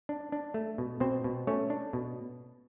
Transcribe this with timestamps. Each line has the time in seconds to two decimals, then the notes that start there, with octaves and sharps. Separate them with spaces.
0.09 D4
0.32 D4
0.54 A3
0.78 B2
1.00 B2 C4 C5
1.24 B2
1.47 A3 C#4 C#5
1.70 D4
1.93 B2